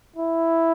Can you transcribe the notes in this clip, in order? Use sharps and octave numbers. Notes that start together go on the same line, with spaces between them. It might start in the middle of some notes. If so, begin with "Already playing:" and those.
E4